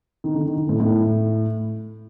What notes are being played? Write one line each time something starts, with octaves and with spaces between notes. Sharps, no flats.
D#3
D3
D#3
D#3
A2
A2